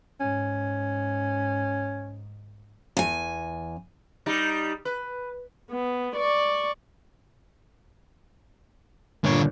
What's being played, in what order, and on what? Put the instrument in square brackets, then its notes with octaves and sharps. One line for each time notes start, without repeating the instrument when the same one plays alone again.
[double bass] G#2 [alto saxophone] C#4
[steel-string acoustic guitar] E2 G#5
[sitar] G3 D#4
B4
[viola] B3
D5 C#6
[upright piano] G1 A#2 [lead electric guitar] D3 C#5